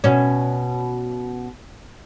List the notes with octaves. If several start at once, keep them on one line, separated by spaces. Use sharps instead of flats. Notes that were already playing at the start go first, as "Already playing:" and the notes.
B2 C#4